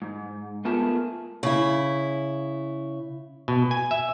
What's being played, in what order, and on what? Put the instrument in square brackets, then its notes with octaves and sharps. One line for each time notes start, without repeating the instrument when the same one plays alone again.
[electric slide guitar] G#2
A3 B3 F4 G#4 A#4 A5
[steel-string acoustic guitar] C#3 E4
[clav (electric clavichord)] B2
G#5
E5